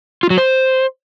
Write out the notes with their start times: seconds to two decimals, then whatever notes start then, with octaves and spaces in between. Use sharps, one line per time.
0.23 F4
0.30 F#3
0.38 C5